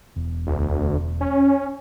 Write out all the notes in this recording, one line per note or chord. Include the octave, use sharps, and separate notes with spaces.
E1
D2
C#4